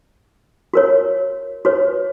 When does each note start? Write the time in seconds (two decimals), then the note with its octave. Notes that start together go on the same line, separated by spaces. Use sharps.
0.73 F#4 A#4 C#5
1.65 F#4 B4 C#5